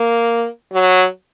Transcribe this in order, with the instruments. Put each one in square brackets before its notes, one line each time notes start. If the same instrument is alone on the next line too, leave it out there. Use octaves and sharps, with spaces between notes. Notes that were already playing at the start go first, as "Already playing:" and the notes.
Already playing: [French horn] A#3
F#3